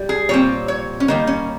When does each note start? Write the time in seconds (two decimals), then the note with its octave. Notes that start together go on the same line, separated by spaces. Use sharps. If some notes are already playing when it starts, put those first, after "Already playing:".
Already playing: G3
0.09 G#4
0.29 A#2 G3 C4 C#5
0.68 C#5
1.00 C#4
1.08 D#3 G3 A#3 D#4
1.27 C#4